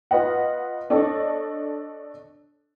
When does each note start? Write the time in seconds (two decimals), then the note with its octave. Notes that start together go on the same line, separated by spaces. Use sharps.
0.11 F4 B4 D#5 F#5
0.90 D4 A4 C#5 D#5